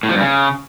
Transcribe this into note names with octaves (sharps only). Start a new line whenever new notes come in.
A2
F3
G2
C#3